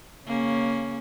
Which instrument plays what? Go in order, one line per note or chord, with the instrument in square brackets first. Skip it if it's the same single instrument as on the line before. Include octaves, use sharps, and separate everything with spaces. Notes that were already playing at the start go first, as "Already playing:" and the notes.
[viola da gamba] C#3 A#3 C#4